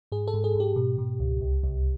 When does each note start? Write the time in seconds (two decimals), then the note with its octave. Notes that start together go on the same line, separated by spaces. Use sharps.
0.12 G#2 G#4
0.28 A4
0.34 G#2
0.44 G#4
0.55 G#2 G4
0.76 B2
0.98 B2
1.20 C#2
1.41 C2
1.63 C2